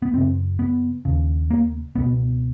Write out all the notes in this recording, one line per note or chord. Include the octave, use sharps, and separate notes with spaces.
B3
F#2 C#3 C4
B3
D#2 C#3
A#3
C#2 B2 B3